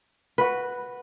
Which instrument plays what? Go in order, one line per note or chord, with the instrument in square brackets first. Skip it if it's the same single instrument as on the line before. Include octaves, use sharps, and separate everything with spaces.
[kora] F#4 B4